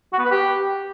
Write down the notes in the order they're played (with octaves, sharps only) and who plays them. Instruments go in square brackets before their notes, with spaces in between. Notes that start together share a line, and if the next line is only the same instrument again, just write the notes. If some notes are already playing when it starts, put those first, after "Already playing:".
[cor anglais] F#4
B3
B4
G4